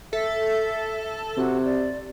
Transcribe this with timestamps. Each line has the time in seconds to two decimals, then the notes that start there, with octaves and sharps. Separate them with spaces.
0.13 A4 E5
1.37 C3 F#4
1.65 D5